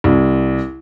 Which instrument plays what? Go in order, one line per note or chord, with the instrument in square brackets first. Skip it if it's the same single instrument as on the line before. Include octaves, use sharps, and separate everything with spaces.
[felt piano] C2